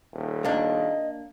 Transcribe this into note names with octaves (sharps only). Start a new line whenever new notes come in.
D#1
A#3 D4 D#5